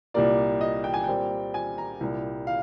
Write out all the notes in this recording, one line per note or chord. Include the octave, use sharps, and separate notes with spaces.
C2 A#2 G3 A#3 D5
D#5
G5
G#5
A#2 G3 C4 G5
G#5
A#5
C2 A#2 G3
F5